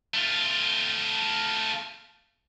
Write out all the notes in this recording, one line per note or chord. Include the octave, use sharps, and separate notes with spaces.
A3 F4